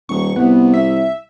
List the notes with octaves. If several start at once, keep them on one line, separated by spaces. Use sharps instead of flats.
D#1 C#6
C2 B3
E5